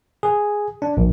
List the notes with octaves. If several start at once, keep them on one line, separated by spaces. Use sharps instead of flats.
G#4
D4
A#1